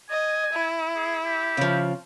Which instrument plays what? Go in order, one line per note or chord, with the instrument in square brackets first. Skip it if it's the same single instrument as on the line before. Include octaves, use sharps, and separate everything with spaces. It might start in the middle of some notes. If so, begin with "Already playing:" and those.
[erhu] D#5 [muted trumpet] G#5
[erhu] E4
[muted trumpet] G#4
G4
[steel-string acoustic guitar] C#3 F3